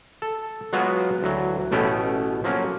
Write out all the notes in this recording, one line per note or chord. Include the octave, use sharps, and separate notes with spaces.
A4
F#3 G#3 B3 F4 F#4
D2 E3 F#3
A1 B2 A3 B3 C#4 G5
F3 F#3 A#3 C#4